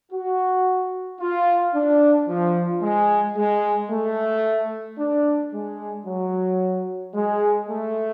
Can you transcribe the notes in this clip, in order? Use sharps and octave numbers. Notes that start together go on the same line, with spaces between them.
F#4
F4
D4
F3
G#3
G#3
A3
D4
G#3
F#3
G#3
A3